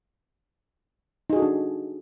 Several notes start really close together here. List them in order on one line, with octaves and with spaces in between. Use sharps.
D#4 G#4 F#4 A4 D4